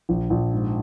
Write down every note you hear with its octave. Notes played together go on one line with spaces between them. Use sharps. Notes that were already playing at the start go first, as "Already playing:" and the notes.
A#1
A#1
G#2